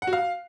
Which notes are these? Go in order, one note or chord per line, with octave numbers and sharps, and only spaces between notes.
F#5
F#4
F5